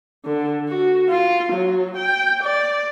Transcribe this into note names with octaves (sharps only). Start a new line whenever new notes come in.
D3
F#4
F4
F#3
G5
D5